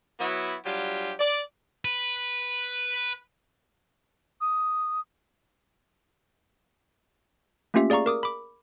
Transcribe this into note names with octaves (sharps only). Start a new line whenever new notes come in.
F#3 B3 E4 F#4
F#3 G3 D4 F4 G4
D5
B4
D#6
A3 A#3 C#4 F4 G4 E5
G#4 D5 F5 A#5 C#6
A#4 D6 D#6
B5 D6